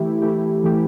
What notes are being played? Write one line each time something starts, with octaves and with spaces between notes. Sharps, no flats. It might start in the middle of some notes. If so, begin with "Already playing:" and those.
Already playing: E3 A3 E4 G4
E3 A3 E4 G4
E3 A3 E4 G4